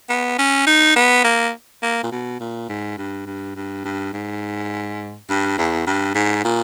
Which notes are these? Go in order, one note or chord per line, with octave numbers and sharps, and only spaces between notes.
B3
C#4
D#4
B3
A#3
A#3
A#2
B2
A#2
G#2
G2
G2
G2
G2
G#2
G2
E2
G2
G#2
A#2